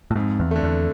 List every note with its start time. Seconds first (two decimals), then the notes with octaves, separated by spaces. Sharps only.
0.11 A2
0.15 F2 G#2
0.40 E2
0.51 D3 A3
0.63 E2